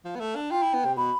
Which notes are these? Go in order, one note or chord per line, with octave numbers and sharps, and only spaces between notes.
F3
B3
A3
D4
F4 G5
E4
B3
C3
B2 B5